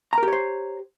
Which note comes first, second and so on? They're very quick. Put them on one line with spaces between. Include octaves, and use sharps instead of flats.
A#5 A#4 G4 C#5 C5